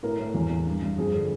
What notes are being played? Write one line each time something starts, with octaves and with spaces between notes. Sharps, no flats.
A2 A#4
A2
E2
E2
G2
G2
F2 G#4
D3